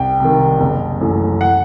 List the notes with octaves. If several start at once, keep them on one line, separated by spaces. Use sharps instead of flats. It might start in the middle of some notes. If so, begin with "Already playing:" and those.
Already playing: C2 G5
C3 D#3
F#1
F#2 E3 A3
F#5